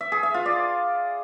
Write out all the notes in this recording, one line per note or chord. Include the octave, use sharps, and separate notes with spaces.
E5
G#4
E5
F4
D5